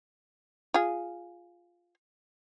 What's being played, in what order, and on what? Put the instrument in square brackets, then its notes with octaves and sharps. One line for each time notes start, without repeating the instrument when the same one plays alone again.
[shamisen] F4 G#4